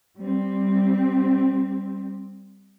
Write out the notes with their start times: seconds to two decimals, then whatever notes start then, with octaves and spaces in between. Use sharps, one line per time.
0.18 G3 C4